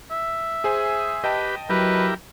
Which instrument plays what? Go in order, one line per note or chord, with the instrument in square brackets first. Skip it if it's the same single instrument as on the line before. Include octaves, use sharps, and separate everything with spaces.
[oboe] E5
[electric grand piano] G#4 C5 G#5
[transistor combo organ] G4 B4 [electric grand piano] D#5 G5 A5
[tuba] F#3 [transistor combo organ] E4 G4 A#4 [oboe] B4